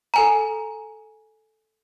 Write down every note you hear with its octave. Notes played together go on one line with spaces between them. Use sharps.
A4 G#5 A#5